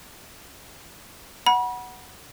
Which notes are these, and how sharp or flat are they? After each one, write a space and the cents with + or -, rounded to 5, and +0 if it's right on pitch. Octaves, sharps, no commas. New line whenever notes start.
F#5 +0 B5 -35